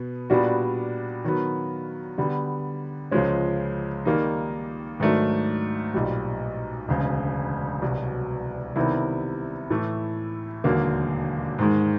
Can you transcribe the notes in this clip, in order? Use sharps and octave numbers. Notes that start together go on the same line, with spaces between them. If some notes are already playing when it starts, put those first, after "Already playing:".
Already playing: B2 B3
A#2 G3 B3 D4 F#4
D#3 F#3 B3
D3 G3 B3
C#2 C#3 F3 G#3 C#4
D#3 G3 A#3 D#4
G#2 D#3 F#3 A3 D4
B1 A#2 G3
E1 D2 C#3
C2 B2 F#3
C3 D#3 G3 B3 E4
A2 E3 A3
E1 D#2 D3 F#3 A#3
G#2 D#3 G#3